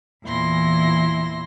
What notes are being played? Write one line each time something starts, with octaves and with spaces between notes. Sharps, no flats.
E2 A#2 E3 E4 C6 A#6